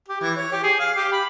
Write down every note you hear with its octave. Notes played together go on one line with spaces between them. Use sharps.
G4
E3
C#5
G4
G#4
F5
G4
B5